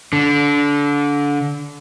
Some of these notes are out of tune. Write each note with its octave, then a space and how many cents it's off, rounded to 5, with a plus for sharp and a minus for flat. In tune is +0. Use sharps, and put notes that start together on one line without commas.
D3 -25